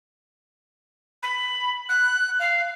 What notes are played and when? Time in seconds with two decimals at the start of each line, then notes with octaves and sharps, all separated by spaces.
1.22 B5
1.89 F#6
2.39 F5